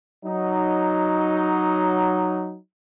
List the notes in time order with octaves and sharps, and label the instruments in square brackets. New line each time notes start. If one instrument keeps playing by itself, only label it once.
[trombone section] F#3 D#4